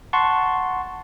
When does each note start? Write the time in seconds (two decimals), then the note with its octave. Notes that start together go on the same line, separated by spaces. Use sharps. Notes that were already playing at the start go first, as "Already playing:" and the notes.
0.13 F#5 A5 C6 C#6